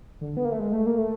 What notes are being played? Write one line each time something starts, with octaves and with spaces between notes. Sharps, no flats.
D3
B3
A#3
A3
G#3
A3
A#3
A3